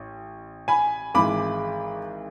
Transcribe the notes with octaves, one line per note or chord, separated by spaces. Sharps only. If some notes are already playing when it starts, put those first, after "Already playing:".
Already playing: A1
G#5 B5
G#1 G#2 E3 G#3 B5 D6